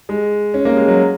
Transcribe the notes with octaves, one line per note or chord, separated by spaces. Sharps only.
G#3
C#4
A#3
G#3
F#3